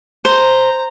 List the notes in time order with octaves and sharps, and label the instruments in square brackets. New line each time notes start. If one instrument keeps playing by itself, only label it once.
[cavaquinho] C5 [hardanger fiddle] A#5